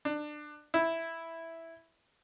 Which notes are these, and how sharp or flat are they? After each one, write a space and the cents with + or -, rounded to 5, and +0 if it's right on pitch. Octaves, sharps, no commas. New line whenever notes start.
D4 +25
E4 +0